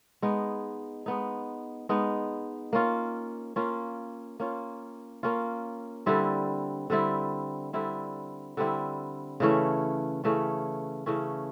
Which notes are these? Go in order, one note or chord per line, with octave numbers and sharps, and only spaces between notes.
G#3 B3 D#4
G#3 B3 D#4
G#3 B3 D#4
A#3 C#4 F4
A#3 C#4 F4
A#3 C#4 F4
A#3 C#4 F4
D3 G3 C4 E4
D3 G3 C4 E4
D3 G3 C4 E4
D3 G3 C4 E4
C#3 E3 A3 C#4
C#3 E3 A3 C#4
C#3 E3 A3 C#4